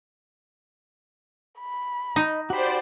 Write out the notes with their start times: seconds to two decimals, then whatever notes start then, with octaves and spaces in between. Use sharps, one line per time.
1.60 B5
2.16 D#4 D#5
2.50 F#4 G4 C5 D5 B5